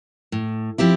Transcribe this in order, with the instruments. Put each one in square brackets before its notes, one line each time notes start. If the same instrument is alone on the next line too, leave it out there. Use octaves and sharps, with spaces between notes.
[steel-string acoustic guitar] A2
F3 C4 E4 G4